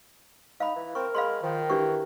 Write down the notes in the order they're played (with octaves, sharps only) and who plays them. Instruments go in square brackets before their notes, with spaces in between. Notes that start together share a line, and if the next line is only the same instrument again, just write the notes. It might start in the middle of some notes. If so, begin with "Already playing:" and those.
[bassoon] D#4 [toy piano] F5 B5
[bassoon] E3
[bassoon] C4 [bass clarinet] A#4 [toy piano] C#6
[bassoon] G#3 [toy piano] F5 B5 C6
[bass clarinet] D#3 [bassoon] F3
[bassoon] E3 [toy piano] D4 G4 C#6